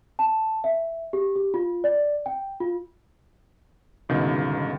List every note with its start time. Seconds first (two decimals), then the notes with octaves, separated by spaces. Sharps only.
0.19 A5
0.64 E5
1.13 G4
1.36 G4
1.54 F4
1.84 D5
2.26 G5
2.60 F4
4.09 G1 C#2 B2 D#3